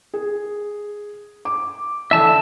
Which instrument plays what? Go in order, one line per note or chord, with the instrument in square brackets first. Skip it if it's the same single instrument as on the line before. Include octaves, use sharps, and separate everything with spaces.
[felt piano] G#4
D6
[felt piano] D3 E3 [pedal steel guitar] E5 A5 E6